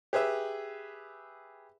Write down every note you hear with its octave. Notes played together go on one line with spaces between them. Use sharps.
G4 G#4 B4 E5